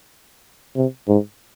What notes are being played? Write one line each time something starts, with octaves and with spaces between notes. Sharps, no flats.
C3
G#2